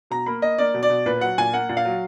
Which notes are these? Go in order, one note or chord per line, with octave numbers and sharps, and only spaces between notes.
B2 A#5
A#3 B5
A#3 D#5
A#3 D5
B2
D5
B2
A#2 B4
F#3 F#5
A#2 G#5
A#3 F#5
A#2
F5
F#3